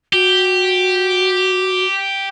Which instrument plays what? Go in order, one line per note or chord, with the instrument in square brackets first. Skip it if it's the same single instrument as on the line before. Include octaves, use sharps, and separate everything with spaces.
[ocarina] F#4 [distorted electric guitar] G4